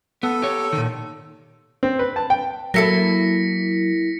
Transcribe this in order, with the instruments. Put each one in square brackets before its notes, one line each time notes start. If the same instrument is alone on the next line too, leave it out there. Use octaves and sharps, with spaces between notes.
[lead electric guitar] B3 [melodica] A4
[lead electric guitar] G4 C#5
A#2 D#3
[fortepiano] C4
B4
A5
G5
[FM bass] F#3 [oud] A#3 E4 A4 [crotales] A#6 B6 C#7